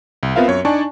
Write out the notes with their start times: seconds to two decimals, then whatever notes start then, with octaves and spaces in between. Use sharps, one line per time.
0.23 C2
0.36 B3 C4 F4 A#4 E5 F5
0.48 F#2 C#5
0.65 D4 D#4 D5 G#5 A5 C#6